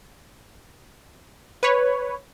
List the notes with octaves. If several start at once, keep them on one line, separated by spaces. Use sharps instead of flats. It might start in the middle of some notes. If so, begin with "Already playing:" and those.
B4 C#5